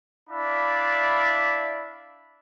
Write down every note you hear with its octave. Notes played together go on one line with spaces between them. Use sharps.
D4 E4 D5 E5 F5 B5